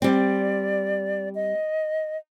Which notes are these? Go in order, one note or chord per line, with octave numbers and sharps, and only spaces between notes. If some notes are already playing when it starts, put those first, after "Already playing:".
G3 C4 D5
D#5